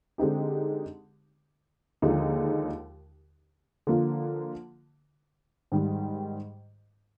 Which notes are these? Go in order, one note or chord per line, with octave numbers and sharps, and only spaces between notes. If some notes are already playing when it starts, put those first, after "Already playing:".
D3 G#3 C4 D#4 G4
D#2 D3 F3 G#3 D#4
D3 F3 A#3 F4
G#2 D#3 G3